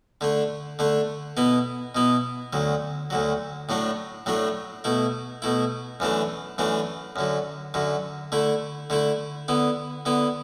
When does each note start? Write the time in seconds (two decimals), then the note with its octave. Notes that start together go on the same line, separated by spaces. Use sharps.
0.21 D3 A3 D4
0.79 D3 A3 D4
1.37 B2 B3 E4
1.95 B2 B3 E4
2.53 D2 D3 F#3
3.10 D2 D3 F#3
3.69 A2 F#3 A3 D4
4.26 A2 F#3 A3 D4
4.84 B2 A3 E4
5.42 B2 A3 E4
6.00 F#2 E3 A3 D4
6.58 F#2 E3 A3 D4
7.16 F#2 D3 F#3
7.74 F#2 D3 F#3
8.32 D3 A3 E4
8.90 D3 A3 E4
9.48 D3 B3 E4
10.06 D3 B3 E4